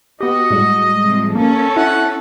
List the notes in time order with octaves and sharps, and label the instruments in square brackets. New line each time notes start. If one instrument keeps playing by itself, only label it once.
[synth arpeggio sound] B3 G4 [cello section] F#4 [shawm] D#5
[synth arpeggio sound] A2 G3 G#3
[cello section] C3 F3
[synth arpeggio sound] A#3 [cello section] C#4 [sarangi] A4
[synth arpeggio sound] E4 [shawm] F#5